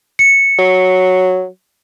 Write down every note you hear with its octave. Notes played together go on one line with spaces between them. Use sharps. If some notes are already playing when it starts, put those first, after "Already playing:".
C#7
F#3